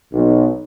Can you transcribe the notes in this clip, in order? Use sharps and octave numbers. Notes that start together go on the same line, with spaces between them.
B1